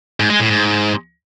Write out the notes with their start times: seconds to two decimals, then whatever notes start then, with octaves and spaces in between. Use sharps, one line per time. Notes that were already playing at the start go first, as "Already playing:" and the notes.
0.20 G#2
0.30 G#3
0.40 A2
0.50 G#2